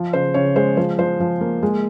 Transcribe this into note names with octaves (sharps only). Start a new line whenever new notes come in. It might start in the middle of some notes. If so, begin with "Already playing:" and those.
Already playing: F3
C#3 C5
C#3 C#5
G#3 C5
F3 C5
F3 C5
F3
A#3
G#3